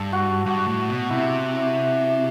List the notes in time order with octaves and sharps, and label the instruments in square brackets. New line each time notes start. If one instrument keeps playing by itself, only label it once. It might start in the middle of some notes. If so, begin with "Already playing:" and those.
Already playing: [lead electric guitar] G2 [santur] A4
[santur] F#4
[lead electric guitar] G2 [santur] F#4
[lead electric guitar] A2
B2
[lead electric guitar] C3 [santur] E4